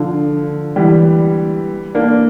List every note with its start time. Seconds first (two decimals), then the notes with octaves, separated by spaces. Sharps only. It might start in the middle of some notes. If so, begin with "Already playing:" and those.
Already playing: D3 F3
0.76 E3 G3
1.95 A#3 D4